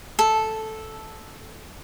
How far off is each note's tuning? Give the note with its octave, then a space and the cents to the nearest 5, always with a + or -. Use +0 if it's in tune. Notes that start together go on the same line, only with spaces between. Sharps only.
A4 -5